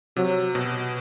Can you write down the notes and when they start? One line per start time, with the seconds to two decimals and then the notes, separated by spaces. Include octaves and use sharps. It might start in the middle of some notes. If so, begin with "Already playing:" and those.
0.16 C3 F#3
0.55 B2